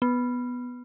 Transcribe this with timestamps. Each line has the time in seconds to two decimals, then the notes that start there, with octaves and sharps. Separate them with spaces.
0.02 B3